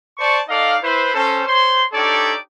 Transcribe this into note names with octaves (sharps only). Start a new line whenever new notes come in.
C5 D5 A5 C#6
D#4 A4 D5 D#5 F5
E4 B4 C5
C#4 A4 C5
C5 C#5 C6
D4 D#4 G4 A4 C#5 D5